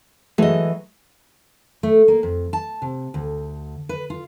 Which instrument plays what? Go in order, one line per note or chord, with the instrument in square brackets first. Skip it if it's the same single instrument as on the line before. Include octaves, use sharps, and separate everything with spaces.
[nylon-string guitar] E3 D#5 [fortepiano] F#3 G#3 A3
[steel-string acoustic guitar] A3
A#3
F2
A5
C3
D2
B4
F4